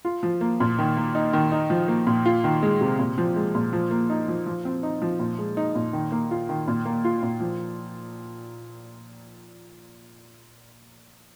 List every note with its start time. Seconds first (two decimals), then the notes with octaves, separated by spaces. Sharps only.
0.05 F4
0.23 F3
0.41 A#3
0.60 A#2
0.79 D#3
0.97 A#3
1.15 D#4
1.33 D#3
1.52 D#4
1.70 F3
1.88 A#3
2.07 A#2
2.26 F4
2.44 D#3
2.63 G#3
2.81 C3
2.99 A#2
3.18 F3
3.36 G#3
3.55 A#2
3.73 F3
3.91 A#3
4.10 D#4
4.28 F3
4.46 F3
4.65 C4
4.83 D#4
5.02 F3
5.20 A#2
5.38 G#3
5.57 D#4
5.75 A#2
5.93 D#3
6.12 A#3
6.31 F4
6.49 D#3
6.68 A#2
6.85 A#3
7.04 F4
7.23 A#2
7.40 F3